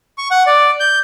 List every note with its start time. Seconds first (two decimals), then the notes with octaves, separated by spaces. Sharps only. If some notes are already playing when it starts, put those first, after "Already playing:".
0.18 C#6
0.31 F#5
0.46 D5
0.80 G6